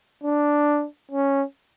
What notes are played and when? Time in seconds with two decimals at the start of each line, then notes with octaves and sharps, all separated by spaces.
0.24 D4
1.12 C#4